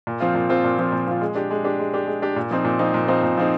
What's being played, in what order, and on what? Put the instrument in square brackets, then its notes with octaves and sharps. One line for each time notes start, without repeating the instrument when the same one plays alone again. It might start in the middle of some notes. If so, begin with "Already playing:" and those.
[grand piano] A#2
F3 C4 F4
A#2
F3 C4 F4
A#2
F3 C4 F4
A#2
F3 C4 F4
G#3
D4 G4
G#3
D4 G4
G#3
D4 G4
G#3
D4 G4
A#2
F3 C4 D#4
A#2
F3 C4 D#4
A#2
F3 C4 D#4
A#2
F3 C4 D#4